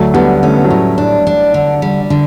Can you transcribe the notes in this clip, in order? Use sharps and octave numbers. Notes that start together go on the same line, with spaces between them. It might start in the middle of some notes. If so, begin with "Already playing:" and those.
Already playing: D2 F#3 A3
D3 G3 B3
A3 C#4
B3
F#3 A3
A2
D4
D4
D3
G3
D3